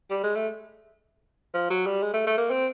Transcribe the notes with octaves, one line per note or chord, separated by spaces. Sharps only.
G3
G#3
A3
F3
F#3
G3
G#3
A3
A3
A#3
C4